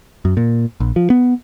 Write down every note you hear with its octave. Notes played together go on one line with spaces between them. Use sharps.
F#2
A#2
A#1
F3
B3